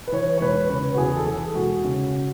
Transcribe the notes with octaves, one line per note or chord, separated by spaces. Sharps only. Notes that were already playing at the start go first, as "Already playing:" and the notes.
B4
E3 C#5
C#5
E1 B4
C#3 B4
F#4
E2 G#4
A4
E3 G#4
E1 F#4
C#3